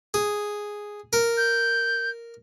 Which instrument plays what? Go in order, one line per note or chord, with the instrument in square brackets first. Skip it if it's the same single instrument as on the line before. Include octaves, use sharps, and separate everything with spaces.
[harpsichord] G#4
A#4
[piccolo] G6